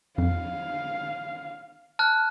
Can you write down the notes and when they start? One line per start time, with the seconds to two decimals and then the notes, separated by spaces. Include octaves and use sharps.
0.18 F2 F5
1.99 A5 F6 F#6